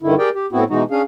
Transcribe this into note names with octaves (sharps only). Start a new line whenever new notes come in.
G2 D3 D#3 E4
G4 G#4 A#4 D5 G5
G4
A2 B3 C4 E4 F#4
B2 E3 G#3 D#4 F#4
C#4 D4 G#4 F5